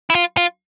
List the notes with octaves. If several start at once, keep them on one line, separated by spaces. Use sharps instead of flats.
E4
F4
F4